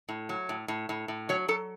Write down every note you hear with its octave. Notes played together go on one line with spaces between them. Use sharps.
A2
F#3
A2
A2
A2
A2
F#3 C#5
F#3 A4